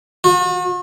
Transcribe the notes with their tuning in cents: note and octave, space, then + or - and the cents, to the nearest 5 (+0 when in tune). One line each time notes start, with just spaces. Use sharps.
F#4 -45